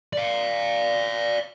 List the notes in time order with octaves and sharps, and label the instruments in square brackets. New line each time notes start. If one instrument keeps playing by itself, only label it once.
[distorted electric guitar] D5 F5